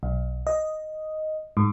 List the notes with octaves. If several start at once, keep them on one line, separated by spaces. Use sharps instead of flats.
B1
D#5
G#2